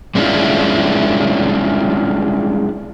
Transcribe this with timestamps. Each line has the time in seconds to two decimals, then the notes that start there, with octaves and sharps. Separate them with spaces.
0.15 G3 G#3 C#4 D4 E4 F4